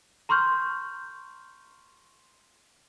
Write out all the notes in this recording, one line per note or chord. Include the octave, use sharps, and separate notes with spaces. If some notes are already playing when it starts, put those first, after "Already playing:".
A#5 C6 C#6 F6 G6